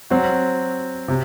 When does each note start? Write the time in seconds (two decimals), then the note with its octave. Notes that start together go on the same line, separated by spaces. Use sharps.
0.10 F#3 C4 F#4
1.08 C3